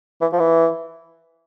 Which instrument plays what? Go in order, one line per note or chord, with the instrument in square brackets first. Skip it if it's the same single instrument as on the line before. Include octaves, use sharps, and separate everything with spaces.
[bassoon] E3
F3
E3